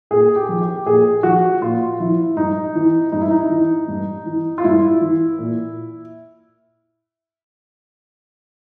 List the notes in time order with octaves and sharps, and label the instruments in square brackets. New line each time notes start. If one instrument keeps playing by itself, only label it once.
[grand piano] A#2 G#4
G4
F3
G4
A#2 G#4
F3 F#4
A#2 F4
F3 E4
G2 D#4
E3
G2 D#4
E4
D#4
E3
G2
E3
F4
G2 E4
E3
A#2